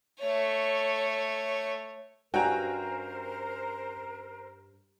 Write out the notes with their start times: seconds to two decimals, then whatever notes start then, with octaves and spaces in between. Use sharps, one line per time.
0.20 A3 C#5
2.34 G2 C#4 F#4 A#4 C5 G5 G#5 A#5